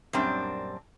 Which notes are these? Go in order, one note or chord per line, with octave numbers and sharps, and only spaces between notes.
F#2 A#2 G3 C4 D4